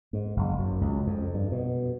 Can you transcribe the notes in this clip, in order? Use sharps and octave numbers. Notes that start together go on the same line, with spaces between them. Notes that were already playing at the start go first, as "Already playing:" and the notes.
G#2
F#1
F#2
C#2
F2
G2
B2